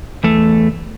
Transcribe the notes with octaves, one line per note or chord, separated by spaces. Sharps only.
E2 A3